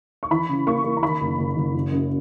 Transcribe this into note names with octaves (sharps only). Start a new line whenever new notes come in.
C#6
E3 B5
C#3
A#3 C#6
A#3
A#5
D#3 B5
F#1
F#1
F#1
F#2
F#2